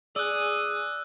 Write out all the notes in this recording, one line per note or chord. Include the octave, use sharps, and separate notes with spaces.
G#4 D5 D#6 E6 F#6